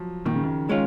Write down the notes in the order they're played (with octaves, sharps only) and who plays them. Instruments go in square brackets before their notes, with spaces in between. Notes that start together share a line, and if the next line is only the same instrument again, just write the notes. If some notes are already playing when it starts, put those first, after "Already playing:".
Already playing: [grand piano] F3 F#3
[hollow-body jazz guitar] A#2 [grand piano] D#3
[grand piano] C#3
D#3
[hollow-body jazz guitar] G#3 C#4 F4